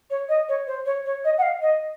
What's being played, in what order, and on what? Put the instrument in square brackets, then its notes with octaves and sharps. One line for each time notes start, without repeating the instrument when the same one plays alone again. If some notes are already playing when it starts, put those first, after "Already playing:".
[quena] C#5
D#5
C#5
C5
C#5
C#5
D#5
F#5
F5
D#5